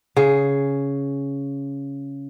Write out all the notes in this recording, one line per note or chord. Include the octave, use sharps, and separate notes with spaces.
C#3 G#4